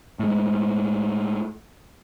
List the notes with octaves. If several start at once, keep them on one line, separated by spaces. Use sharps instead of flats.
A2 G#3